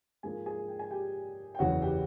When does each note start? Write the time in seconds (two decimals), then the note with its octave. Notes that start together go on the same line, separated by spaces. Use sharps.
0.23 G#2 F3 A#3 G#4 G#5
0.46 G#4 G#5
0.68 G5
0.79 G#5
0.90 G4 G5
1.55 G5
1.59 F#1 E2 C#3 E3 F#4 F#5
1.82 G4 G5